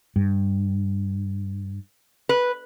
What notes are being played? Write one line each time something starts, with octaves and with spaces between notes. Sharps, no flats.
G2
B4